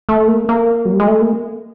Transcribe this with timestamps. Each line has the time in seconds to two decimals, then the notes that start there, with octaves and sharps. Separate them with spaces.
0.09 A3
0.28 A#3
0.49 A#3
0.85 F#3
0.92 G3
1.00 G#3
1.07 A3
1.21 A#3